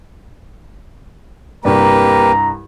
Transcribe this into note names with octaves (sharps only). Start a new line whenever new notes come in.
C2 G2 A#3 G4 B4 A#5